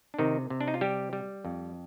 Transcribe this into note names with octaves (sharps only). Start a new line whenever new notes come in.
D4
C3 D#3 D#4
C3
D4
D#4
F4
G3 G4
G3
F2